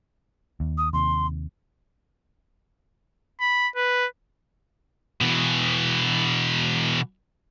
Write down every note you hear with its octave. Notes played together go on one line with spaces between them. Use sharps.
D#2
D#6
D#2 C3 C6
B5
B4
B2 E3